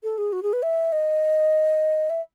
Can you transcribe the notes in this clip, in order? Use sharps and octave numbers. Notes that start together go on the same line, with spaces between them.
A4
G#4
F#4
G#4
B4
E5
D#5
E5